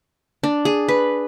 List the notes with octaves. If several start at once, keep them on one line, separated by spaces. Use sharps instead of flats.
D4
G#4
B4